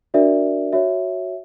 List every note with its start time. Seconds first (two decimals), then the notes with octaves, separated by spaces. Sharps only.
0.14 D4 F#4 A#4 D5 E5
0.73 F#4 C#5 E5